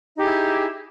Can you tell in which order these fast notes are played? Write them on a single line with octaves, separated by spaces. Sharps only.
D#4 G4 G#4 E4